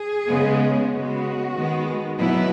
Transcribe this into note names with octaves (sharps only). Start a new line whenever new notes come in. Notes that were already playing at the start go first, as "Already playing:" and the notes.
Already playing: G#4
C#3 G#3 B3
C#3 G#3 B3 F#4
D#3 G#3 B3
B2 F#3 B3 E4